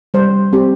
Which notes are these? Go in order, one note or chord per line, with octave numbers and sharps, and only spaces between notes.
G3 C5
C4 G4